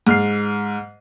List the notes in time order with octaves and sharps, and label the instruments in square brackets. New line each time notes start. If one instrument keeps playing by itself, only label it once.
[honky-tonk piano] G#2 F6 C7